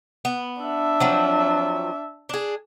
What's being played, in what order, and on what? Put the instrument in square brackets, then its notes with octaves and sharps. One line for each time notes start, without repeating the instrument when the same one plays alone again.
[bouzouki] B3
[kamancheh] D4 E5
[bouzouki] F3 F#3 C4
D4 G#4